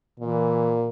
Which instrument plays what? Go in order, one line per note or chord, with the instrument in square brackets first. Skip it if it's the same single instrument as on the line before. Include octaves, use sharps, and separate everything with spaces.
[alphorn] A#2 [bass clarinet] E3